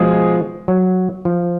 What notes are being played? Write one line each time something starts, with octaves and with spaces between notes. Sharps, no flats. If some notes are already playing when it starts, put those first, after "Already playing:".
Already playing: B2 F3 G#3 G#4
F#3
F3